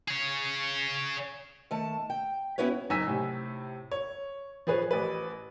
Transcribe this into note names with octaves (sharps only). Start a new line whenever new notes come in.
G#4 C#5
D#3 A3 A5
G5
B3 C#4 E4 F#4 B4 C#5
F#1 D#4 G#5 E6 B6
A2 C3
C#5
F3 G#4 B4 C#5
A1 B4